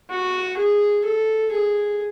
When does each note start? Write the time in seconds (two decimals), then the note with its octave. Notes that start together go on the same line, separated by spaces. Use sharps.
0.10 F#4
0.57 G#4
1.05 A4
1.51 G#4